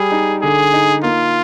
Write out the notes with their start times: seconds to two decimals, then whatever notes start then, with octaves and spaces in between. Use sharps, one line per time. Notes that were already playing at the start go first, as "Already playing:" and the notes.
Already playing: G3 G#4
0.12 D#4
0.42 D3 G#4
0.74 D#4
1.03 A#3 F4